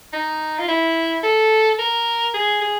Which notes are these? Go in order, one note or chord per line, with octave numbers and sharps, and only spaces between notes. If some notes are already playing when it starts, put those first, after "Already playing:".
D#4
F4
E4
A4
A#4
G#4
G#4